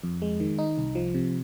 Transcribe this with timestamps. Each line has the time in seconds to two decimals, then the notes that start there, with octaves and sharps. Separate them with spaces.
0.04 F2
0.22 G#3
0.40 D#3
0.58 D#4
0.78 C2
0.95 F3
1.14 C3